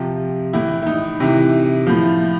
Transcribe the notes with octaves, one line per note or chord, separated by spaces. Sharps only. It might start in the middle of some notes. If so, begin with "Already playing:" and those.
Already playing: C3 F3
A2 E3 E4
E4
D#4
C3 E3
A2 F3